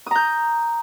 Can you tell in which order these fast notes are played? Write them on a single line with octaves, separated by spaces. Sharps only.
D#6 A#5 G6